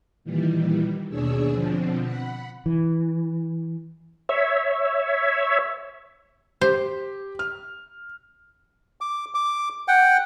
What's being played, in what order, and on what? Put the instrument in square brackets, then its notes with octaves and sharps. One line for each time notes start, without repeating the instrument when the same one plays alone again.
[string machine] A#2 D#3 E3 G3
D#2 B2 D4 G#4 C#5 E6
B2 D3 F3 C4
F#5 B5
[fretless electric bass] E3
[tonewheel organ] C#5 E5
[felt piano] G4 [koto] C5
[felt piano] F6
[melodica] D6
D6
F#5 G5